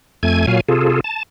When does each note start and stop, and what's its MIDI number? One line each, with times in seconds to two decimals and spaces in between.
0.23 0.46 41
0.23 0.46 57
0.23 0.46 80
0.23 0.46 92
0.47 0.60 46
0.47 0.60 54
0.47 0.60 77
0.47 0.60 80
0.69 1.00 48
0.69 1.00 65
0.69 1.00 68
0.69 1.00 69
1.04 1.23 81